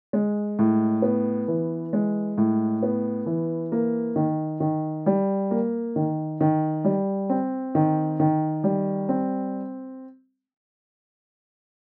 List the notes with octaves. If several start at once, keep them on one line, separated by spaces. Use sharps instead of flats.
G#3
A2
B3
E3
G#3
A2
B3
E3
A#3
D#3
D#3
G3
A#3
D#3
D#3
G3
C4
D#3
D#3
G3
C4